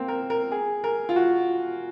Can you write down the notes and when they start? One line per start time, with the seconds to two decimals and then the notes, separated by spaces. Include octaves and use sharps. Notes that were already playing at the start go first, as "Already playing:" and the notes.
Already playing: A#3 C4
0.08 A#4
0.30 A#4
0.52 G#4
0.84 A#4
1.09 F4
1.16 F#4